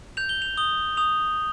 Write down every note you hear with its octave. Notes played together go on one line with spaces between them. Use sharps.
G6 F7
G7
F7
D#6 G7
D#6 F7